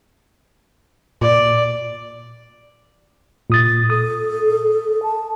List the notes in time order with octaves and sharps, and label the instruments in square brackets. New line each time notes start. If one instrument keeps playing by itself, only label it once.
[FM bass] A#2 [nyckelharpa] D5
[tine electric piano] A#2 D#6 A6
[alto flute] A4 [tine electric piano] D#6
[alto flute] A5